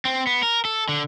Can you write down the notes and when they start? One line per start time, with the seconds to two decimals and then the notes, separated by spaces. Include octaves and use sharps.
0.05 C4
0.27 B3
0.43 A#4
0.65 A4
0.89 D3